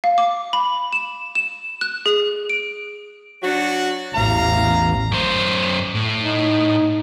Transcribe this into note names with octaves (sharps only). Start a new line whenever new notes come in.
F5
D6
B5
E7
E7
F#6
G#4
D7
F#3 D4 F#4
A1 E2 F5 A#5
F#2 C5
A2
D#4